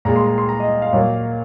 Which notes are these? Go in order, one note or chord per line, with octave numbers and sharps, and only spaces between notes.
A#2 G#3 A#5
C6
A#5
C6
A#5
D#5
F5
A#2 F#3 A#3